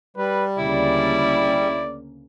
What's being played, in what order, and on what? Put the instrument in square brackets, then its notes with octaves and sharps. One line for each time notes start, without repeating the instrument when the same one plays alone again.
[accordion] G3 [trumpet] B4
[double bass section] D2 C#3 A#3 [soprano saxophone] E4 [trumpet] D5